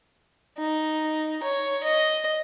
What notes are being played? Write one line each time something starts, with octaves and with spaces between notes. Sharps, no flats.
D#4
C#5
D#5